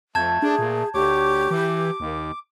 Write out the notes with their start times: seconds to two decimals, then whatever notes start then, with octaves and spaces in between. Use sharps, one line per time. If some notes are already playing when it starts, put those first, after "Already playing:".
0.15 F2 A3 A5 G6 G#6
0.42 D4 G#4
0.59 A#2
0.94 D2 G4 C#5 D6
1.51 E3 D6
2.00 D#2